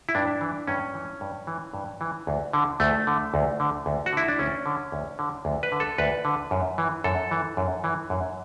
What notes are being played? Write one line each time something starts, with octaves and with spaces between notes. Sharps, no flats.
E4
G2 D4
E3
G2 C#4
E3
G2
E3
G2
E3
D2
D3
D2 A3
D3
D2
D3
D2
F#4
D3 E4
D4
D2 C#4
D3
D2
D3
D2
B4
D3
A4
D2 B4
D3
F#2
E3
F#2 A4
E3
F#2
E3
F#2